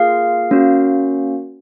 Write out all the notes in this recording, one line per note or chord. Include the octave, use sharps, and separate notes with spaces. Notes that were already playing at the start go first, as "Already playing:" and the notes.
Already playing: A#3 F4 G#4 F5
A#3 C#4 F#4